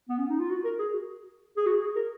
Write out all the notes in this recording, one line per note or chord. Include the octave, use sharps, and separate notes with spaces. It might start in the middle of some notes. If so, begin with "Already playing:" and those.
B3
C#4
D#4
F4
F#4
A#4
G#4
F#4
G#4
F#4
G#4
A#4